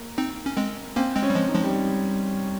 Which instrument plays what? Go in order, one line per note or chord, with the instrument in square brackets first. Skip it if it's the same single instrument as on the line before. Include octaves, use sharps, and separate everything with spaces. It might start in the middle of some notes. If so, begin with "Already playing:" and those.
Already playing: [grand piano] A#3
[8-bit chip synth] C4 D#4
C#4
G#3 C4
[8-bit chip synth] A#3 C#4 [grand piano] C4
[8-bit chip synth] G#3 C4
[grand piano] C#4
[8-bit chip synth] G3
F3 G#3
[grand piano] D#4
[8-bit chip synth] F3 G#3
[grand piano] G3